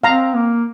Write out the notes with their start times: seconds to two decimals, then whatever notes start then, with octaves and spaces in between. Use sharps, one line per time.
0.04 C4 F5 A#5
0.35 A#3